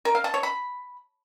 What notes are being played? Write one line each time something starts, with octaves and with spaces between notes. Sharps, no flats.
A#4
F5
A5
C#5
B5